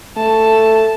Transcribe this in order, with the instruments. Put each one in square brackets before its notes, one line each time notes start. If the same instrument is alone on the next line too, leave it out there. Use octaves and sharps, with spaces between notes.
[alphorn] A3 [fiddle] A5